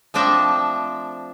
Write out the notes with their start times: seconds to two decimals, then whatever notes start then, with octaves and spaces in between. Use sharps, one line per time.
0.14 F3 A3 C4 D4 D#5 E5